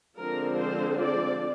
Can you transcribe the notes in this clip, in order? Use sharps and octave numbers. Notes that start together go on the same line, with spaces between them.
D3 F3 G#3 C4 A#4
C5
D5